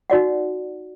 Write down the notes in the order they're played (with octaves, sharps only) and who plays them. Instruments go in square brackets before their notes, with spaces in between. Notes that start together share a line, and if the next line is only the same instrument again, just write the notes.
[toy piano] D#4 F#4 D5 F#5